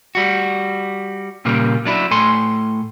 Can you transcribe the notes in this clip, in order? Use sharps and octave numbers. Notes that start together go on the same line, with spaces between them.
G3 F#4
A#2 C#3 G3 A#3
F#3 D4 E4
A2 A4 G#5 C6